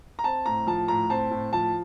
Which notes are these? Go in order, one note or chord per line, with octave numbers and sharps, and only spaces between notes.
A#5
C4 A5
A2 A#5
F3 A5
A2 A#5
C4 A5
A2
F3 A5